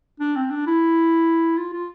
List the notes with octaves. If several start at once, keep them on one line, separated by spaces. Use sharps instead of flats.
D4
C4
D4
E4
F4
F4